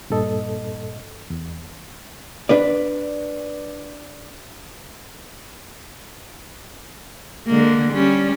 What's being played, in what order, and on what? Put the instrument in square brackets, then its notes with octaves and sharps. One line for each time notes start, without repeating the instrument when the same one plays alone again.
[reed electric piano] G2 A#2 A4 D#5
E2
[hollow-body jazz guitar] D4 B4 D5
[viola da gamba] D3 G#3 A#3
G3 C#4